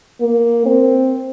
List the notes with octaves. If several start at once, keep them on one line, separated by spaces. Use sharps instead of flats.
A#3
C4